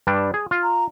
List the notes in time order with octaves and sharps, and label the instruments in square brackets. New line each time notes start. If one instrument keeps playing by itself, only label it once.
[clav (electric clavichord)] G2 G3 D4
G#4
F4
[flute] A#5